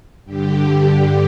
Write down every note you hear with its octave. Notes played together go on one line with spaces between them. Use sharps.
G2 D3 G4